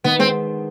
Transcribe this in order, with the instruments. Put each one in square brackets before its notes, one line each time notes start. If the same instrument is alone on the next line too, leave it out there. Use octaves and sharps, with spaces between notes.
[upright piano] D#3 [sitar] B3
[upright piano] G#3 [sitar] C4